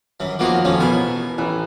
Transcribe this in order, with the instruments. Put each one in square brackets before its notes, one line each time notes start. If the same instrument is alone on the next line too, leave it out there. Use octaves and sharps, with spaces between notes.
[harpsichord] F#2 E3
[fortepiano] D#3 A#3 D6 [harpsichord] F3 B3 F#4
[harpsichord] A2 F3 G#3 [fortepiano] C#4
[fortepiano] B2 E3 B3 [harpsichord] A#4 G#5
[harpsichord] A1 [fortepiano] E3